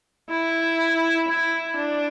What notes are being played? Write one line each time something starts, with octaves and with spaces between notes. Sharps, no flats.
E4
E4
D4